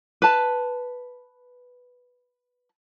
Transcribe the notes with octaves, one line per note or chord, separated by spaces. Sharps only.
B4 A5